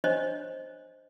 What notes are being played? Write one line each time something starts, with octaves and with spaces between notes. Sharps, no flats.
D4 C5 C#5 D#5